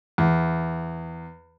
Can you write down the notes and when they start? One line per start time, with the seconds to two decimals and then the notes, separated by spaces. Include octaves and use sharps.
0.18 E2